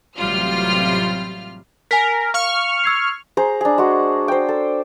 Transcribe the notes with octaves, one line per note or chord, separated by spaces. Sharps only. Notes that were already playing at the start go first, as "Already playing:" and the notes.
A1 C3 F#3 G3 F4 F6
A#4 G#5 B6
F5 C#6 F6
E6 G#6 C7
G#4 C5 A#5
D4 G#4
G#3 F#4
C5 G5
A4